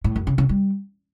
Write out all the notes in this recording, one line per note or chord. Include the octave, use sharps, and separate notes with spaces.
A2
F#2
C#3
C#3
G3